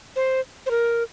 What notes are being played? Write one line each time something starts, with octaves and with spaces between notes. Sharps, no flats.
C5
C5
A#4